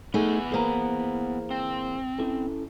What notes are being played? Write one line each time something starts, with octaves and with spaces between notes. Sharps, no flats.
A3 B3 D#4 G#4 G#5
E3 A#3 G#4 C5 A#5
C4
C#4 E4 A4